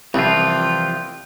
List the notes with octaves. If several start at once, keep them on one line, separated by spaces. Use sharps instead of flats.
C2 E3 F3 F4 G5